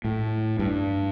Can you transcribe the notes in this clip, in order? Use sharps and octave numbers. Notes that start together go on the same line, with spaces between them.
A2
G2